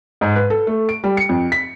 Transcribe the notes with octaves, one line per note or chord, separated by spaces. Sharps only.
G#2
B4
A4
A3
D7
G3
C#7
F2
B6